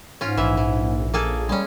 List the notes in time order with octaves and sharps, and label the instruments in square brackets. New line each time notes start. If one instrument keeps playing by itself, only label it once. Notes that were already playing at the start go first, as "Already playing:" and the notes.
[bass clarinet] G#2 [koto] C#4 F4
[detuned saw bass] A#1 [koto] E3 E5
[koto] E3
A#3 G#4 A4
[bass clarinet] G3 [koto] G#3 C#4